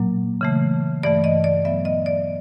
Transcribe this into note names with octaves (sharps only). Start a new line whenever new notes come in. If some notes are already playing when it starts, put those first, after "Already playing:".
Already playing: A#2 F#3 A#3
C#3 E3 A3
G2 E3 A3 D5
D#5
D5
A#2 F#3 B3 E5
D#5
D5